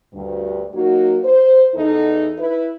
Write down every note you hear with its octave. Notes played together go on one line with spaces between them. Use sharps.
D2 G2
F#3 A#3 D#4 F#4
C5
E2 D#4 A4
E4 B4